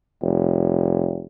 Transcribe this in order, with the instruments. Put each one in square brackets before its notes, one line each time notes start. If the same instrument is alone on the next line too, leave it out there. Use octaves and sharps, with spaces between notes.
[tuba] F1